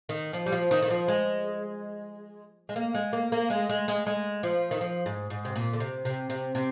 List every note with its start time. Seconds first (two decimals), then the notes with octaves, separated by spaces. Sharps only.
0.09 D#3
0.33 F3
0.46 G3
0.52 F3
0.71 D#3
0.82 D#3
0.90 F3
1.08 G#3
2.69 G#3
2.76 A#3
2.95 G#3
3.13 A#3
3.32 A#3
3.50 G#3
3.69 G#3
3.88 G#3
4.07 G#3
4.43 F3
4.71 D#3
4.81 F3
5.06 G#2
5.30 G#2
5.45 C3
5.56 A#2
5.73 D3
5.80 C3
6.05 C3
6.30 C3
6.55 C3